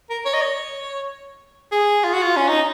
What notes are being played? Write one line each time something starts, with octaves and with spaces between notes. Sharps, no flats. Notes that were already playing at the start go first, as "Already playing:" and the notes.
A#4
C#5
D#5
C#5
G#4
F4
F#4
F4
C#4
D#4